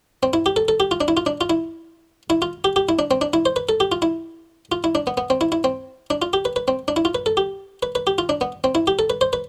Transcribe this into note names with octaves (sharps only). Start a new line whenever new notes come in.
C4
E4
G4
A4
A4
G4
F4
D4
E4
F4
D4
F4
E4
E4
F4
G4
G4
E4
D4
C4
D4
E4
C5
B4
A4
G4
F4
E4
F4
E4
D4
B3
B3
C4
E4
E4
C4
D4
F4
G4
B4
B4
C4
D4
E4
F4
B4
A4
G4
B4
B4
G4
F4
D4
B3
C4
E4
G4
A4
B4
C5
B4